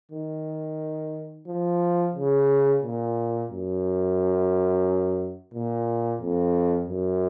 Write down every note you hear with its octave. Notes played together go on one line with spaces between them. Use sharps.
D#3
F3
C#3
A#2
F#2
A#2
F2
F#2